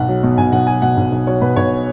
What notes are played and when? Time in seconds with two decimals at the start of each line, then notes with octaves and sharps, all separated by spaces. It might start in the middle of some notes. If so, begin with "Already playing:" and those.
Already playing: B1 F#5
0.08 F#3
0.23 B2
0.38 B1 G#5
0.52 B1 F#5
0.67 F#3 G#5
0.82 B2 F#5
0.97 B1
1.12 B1
1.27 F#3 C#5
1.41 B2 B4
1.56 B1 C#5